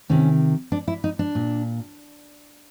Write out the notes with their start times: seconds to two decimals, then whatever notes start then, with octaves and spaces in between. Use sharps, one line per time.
0.09 C3 D#3 C#4
0.72 D4
0.88 E4
1.04 D#4
1.19 D4
1.35 A#2